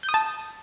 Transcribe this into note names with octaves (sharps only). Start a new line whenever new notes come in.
G6
D#6
A5